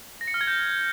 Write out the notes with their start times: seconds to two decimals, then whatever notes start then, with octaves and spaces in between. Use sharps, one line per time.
0.21 A#6
0.28 C#7
0.34 F6
0.41 G#6
0.47 G6